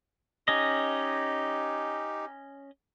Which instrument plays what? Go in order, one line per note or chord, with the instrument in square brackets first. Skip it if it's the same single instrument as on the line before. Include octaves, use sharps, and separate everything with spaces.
[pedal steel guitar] C#4 D#5 [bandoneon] D#4 G4